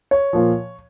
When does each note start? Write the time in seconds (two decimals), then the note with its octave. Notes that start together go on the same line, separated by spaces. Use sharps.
0.11 C#5
0.33 A#2 F3